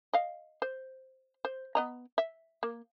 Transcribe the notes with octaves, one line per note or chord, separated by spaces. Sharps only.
D#5 F5
C5
C5
B3 D#5 A#5
E5
A#3